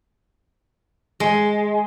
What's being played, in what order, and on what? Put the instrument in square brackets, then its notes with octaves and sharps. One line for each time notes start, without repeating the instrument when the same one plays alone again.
[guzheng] G#3